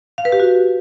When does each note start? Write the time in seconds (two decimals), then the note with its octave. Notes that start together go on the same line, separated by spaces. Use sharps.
0.18 F5
0.25 B4
0.32 G4
0.40 F#4